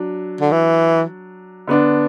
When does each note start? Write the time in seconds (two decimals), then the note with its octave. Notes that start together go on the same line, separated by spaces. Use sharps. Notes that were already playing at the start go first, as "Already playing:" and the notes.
Already playing: F#3 D4
0.41 D3
0.52 E3
1.68 D3 B3 D4